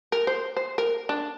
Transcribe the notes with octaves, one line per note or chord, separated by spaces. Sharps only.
A#4
C5
C5
A#4
D4